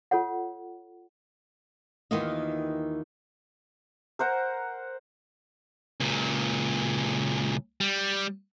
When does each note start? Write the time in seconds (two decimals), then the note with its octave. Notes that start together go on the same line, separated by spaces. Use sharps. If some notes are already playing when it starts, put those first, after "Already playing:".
0.11 F4 A4 C#5 F#5
2.11 D#2 D#3 E3 B3 F4 D#5
4.19 A#4 C5 F#5 A#5
6.00 C#2 A#2
7.81 G3